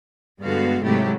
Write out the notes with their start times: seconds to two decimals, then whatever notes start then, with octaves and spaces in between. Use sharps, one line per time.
0.41 G2 D3 G#3 B3 F#4 F5
0.83 G#2 C3 F#3 A3 E4 G4